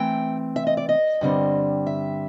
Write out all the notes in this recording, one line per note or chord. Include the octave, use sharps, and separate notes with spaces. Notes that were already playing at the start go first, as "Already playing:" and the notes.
Already playing: E3 A3 C4 G5
E5
D#5
D5
D#5
G2 D3 G3 C4
E5